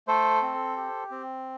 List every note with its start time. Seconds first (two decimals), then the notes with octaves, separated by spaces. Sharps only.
0.08 A3 A4 C5
0.42 C4
0.76 G4
1.11 C4